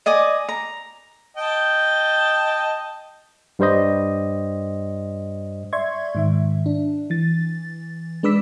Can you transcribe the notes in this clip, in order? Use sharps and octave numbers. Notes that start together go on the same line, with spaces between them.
D5 D#5 G#5 D6
A#5
D#5 G5 A5
G2 G3 C5 D#5
D5 E5 C6 C#6 G#6
G#2 D#3 E5
D4
E3 A6
G#3 D4 B4 D6 E6 B6